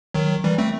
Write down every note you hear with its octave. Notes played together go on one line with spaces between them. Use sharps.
D#3 F#3
E3 G3
A3 C4